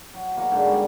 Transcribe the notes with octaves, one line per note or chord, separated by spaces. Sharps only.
F#3
B2 A#3 F#4 C#5
G#2 D3 F#5
G3